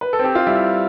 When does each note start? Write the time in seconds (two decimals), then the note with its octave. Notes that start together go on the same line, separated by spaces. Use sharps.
0.01 B4
0.13 A4
0.19 C4
0.24 G4
0.35 F4
0.47 G3 E4